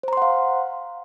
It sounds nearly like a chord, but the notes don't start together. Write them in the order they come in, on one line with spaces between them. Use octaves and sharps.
C5 A#5 C6 F#5 F5